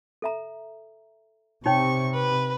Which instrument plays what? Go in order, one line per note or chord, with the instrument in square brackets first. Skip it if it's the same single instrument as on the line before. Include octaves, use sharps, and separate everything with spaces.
[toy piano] A4 E5 A#5
[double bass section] C3 [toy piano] D#4 C#5 G5 [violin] C#6
[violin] B4